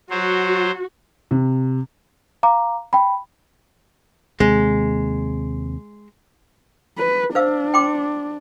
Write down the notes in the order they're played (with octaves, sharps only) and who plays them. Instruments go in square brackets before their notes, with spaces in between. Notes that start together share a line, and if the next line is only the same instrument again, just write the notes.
[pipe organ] F#3 C5 [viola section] F#4
[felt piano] C3
[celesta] F5 A#5 D6
G5 B5
[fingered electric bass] D#2 C3 C4 [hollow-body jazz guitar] G#3
[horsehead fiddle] B4
[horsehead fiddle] D4 [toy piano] C5 F5 E6
[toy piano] G5 C6 D6